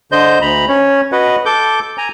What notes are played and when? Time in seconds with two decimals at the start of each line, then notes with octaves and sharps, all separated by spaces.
0.12 D3 C5 D#5 G6
0.41 D2 A#5 B5
0.68 C#4 C#5
1.12 F#4 B4 D#5 F#5
1.46 A4 D6 G6
1.98 G#5 A#5